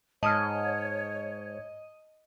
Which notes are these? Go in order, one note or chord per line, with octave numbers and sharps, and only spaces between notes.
G#2 C#5 D#5 A5 D#6 F6